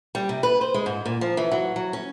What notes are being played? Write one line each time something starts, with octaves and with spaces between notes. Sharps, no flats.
G3
C3
B4
C5
G#3
G#2
A#2
F3
E3
F#3
F#3
C#4